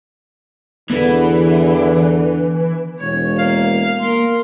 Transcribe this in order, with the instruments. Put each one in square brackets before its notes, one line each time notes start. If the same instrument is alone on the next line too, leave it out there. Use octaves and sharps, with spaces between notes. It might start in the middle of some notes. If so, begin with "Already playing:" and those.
[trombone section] E2 [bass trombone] D3 [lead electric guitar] E3 [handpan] B3
[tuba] E1 [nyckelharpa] C#5
[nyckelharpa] A#3 [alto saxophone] F5
[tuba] A#3 [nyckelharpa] A#4 C6